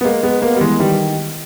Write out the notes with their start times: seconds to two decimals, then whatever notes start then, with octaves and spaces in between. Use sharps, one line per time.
0.01 B3
0.04 G#3 A#3
0.23 G#3 B3
0.42 A#3 B3
0.56 G3
0.61 E3 G#3
0.80 D#3 G3